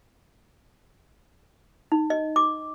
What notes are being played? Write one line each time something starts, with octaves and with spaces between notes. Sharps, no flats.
D#4
D#5
D6